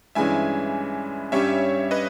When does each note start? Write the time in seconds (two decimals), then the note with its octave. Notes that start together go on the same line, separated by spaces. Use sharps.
0.15 G2 E3 G#3 C#4 E5 G#5
1.32 G2 G3 C#4 G4 C#5 E5
1.91 B4 D#5